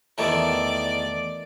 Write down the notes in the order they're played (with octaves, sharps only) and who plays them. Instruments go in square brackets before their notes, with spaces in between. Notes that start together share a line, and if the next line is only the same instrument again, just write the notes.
[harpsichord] E2 D#3 A3 [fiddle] D5